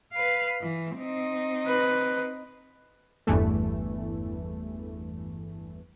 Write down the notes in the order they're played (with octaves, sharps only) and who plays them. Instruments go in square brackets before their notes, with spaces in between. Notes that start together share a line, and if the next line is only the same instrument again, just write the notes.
[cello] B4 F5
E3
C4 D#4
[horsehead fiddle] B4
[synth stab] G1 E2 G2 E3 A3